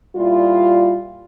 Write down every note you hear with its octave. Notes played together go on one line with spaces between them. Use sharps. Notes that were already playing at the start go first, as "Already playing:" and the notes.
A#2 G3 E4 F4